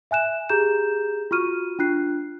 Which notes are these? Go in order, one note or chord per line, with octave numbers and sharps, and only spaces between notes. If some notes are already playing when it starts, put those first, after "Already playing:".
E5 G#5 F#6 E7
G4 G#4 A#5 G6 E7
F4 F#4 C#6 F6 D#7
D4 F4 F#6 C7